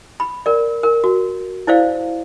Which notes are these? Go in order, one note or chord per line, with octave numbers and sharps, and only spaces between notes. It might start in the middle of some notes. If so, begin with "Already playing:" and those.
B5
A#4 D5
A#4
F#4
E4 C5 D5 F5